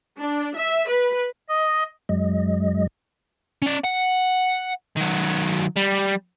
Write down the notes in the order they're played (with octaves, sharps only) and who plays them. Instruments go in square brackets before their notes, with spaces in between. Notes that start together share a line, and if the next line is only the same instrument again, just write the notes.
[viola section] D4
E5
B4
[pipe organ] D#5
[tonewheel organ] F#2 F#3 G#3 D#5
[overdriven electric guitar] C#4 D5
F#5
D#3 F#3
G3